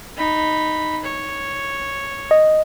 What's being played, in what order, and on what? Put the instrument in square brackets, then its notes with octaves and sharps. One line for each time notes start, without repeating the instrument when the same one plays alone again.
[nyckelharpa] D#4 B5
C#5
[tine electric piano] D#5